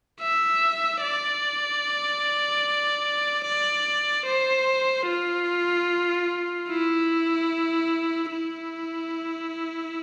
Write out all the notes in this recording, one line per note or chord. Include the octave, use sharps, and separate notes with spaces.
E5
D5
D5
C5
F4
E4
E4